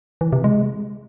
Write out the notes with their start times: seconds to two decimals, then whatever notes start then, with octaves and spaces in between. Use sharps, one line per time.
0.21 E3
0.33 C3
0.44 G#3